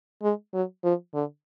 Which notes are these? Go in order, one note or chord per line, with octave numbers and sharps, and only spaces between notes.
G#3
F#3
F3
D3